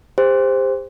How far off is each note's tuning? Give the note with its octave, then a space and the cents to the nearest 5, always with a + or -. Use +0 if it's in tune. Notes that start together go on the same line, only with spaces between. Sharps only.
G4 +35 C5 +0